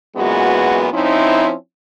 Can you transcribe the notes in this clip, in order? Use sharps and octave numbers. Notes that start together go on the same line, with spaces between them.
F#2 A#2 E3 G#3 B3 F#4
F3 C4 C#4 D#4 E4